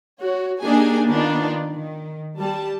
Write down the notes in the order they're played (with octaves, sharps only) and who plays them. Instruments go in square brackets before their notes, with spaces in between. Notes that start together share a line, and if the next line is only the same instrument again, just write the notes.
[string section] F#4 C#5
A#3 D4 D#4 G4 G#4 G#5
D#3 B3 D4 D#4 F4 D5
D#3
G3 A5